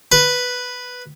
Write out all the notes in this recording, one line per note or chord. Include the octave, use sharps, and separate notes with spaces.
B4